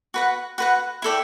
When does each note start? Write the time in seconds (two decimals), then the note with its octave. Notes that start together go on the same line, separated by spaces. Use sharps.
0.14 F#4 B4 F#5
0.58 F#4 B4 F#5
1.02 E4 A4 D5 G5